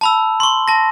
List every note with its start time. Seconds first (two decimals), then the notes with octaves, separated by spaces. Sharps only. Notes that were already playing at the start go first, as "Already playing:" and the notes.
0.01 A5 B5 E6
0.40 C6 C#6
0.68 A5 A#6